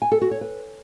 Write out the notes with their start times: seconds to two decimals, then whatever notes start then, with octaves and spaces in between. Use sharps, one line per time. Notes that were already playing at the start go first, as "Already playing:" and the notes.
0.02 G#5
0.12 A4
0.21 F#4
0.31 C#5
0.41 B4